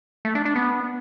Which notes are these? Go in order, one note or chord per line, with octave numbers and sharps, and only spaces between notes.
A3
D4
D4
B3